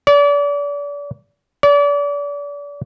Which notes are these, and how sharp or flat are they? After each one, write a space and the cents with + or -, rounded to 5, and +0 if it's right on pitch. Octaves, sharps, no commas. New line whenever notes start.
D5 -35
D5 -35